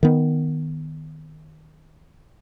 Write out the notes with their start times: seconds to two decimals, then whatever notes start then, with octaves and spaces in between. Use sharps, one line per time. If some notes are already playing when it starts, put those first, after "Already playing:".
0.03 D#3 B3